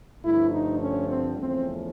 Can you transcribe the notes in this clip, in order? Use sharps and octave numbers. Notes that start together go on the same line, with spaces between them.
G2 D3 F3 A3 E4
D#4
C#4
C4
E2 C#3 F3 A3 C4